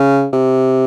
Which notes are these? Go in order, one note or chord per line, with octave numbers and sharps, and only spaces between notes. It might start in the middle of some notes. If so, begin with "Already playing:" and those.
Already playing: C#3
C3